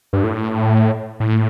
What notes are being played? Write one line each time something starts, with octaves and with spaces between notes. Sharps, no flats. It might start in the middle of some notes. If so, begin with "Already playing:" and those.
G2
A2
A2